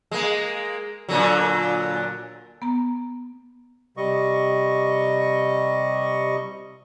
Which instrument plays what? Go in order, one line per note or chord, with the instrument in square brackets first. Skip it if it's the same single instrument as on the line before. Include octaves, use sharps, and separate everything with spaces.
[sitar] G#3 A#3
A#2 D3 F#3
[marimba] B3 A#5
[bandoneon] C3 G3 D#5 C#6